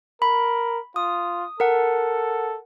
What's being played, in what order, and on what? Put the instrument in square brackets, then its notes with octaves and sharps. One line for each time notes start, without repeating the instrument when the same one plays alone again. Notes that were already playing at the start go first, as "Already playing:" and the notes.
[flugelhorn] A#4 [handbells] B5
[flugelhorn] F4 [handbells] D#6
[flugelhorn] A4 [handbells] A#4 F#5